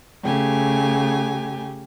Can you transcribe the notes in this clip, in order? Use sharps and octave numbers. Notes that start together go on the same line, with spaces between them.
C#3 A3 G4 G#5